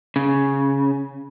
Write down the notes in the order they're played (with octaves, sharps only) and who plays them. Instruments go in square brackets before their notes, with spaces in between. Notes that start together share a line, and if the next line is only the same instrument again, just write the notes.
[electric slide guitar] C#3